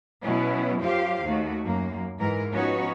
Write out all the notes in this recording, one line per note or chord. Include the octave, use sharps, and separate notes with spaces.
B2 F#3 B3 C#4 E4
F#2 F4 G4 C5 F5
D#2 A3 F#4
F#2 A#3
G#2 E3 A#4
F3 B3 C#4 D#4 F#4 C#5